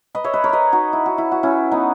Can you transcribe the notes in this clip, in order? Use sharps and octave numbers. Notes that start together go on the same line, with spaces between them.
B4 D#5
C#5 E5
B4 D#5
A#4 C#5
B4 D#5 E5
D#4 F#4
E4
F#4
E4
F#4
C#4 E4
B3 D#4